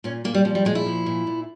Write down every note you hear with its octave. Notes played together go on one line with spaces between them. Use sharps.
A#2 C#4
A#2 A#3
G3
F3 G3
G3
A#2 G#3
E4
F3
A#2
A#2